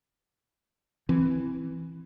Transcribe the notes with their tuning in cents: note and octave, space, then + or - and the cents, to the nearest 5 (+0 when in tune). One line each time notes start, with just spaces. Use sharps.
E3 +0 C4 +0